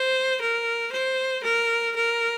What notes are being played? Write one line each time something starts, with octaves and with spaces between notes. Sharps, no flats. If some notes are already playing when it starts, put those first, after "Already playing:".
Already playing: C5
A#4
C5
A#4
A#4